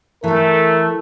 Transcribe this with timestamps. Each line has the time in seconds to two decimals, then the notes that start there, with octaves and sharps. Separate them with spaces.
0.24 E3 A3 A4 A#4